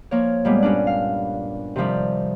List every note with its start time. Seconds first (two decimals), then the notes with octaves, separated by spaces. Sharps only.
0.11 F3 A#3 C#5
0.45 A#2 G3 G#3 B3
0.63 G2 C#4 D4
0.87 F5
1.76 C3 D#3 F3 G3